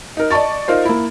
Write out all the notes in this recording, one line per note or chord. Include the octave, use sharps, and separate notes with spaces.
D#4 A#4
D5 D#5 A5 C#6 A6
D#4 F4 A#4 C5
A#3 E4